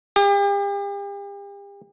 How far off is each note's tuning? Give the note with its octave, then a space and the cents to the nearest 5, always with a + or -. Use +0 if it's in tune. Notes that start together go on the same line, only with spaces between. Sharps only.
G4 +40